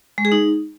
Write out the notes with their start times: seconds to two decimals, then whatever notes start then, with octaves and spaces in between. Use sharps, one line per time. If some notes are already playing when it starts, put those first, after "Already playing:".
0.18 G#3
0.25 G#4
0.32 D#4